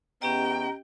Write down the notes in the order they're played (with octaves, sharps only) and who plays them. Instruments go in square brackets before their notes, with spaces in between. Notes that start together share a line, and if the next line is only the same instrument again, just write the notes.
[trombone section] E2 B3 [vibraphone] C#4 G4 D#5 [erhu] G5 [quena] A#5